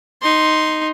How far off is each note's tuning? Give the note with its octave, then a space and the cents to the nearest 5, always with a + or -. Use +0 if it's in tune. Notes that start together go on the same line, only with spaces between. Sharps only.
D#4 +0 C6 +0